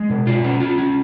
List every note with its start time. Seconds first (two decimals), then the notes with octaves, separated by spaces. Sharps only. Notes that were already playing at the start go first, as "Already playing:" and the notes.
Already playing: G#3
0.10 B2
0.27 F4
0.44 C#4
0.60 F4
0.78 C#4